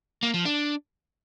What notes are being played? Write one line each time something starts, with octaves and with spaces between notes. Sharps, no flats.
A#3
F3
D4